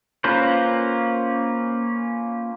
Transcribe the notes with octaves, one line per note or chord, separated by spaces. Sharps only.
A#3 C#4 F4 B4 C5